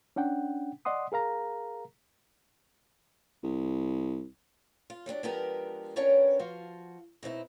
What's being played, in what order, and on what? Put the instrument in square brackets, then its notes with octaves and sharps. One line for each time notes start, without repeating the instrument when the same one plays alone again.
[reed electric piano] C#4 D4 F#5 G5
D5 D#5 F#5 C6 D#6
G#4 A#4 F5 A#5
[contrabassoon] C2
[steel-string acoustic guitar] F4
F#3 G3 C4 D4
F3 G#3 B3 D4 G4 A#4
B3 C#4 D4 A#4 C#5 G5
F3 F4 F#4
B2 C4 D#4 E4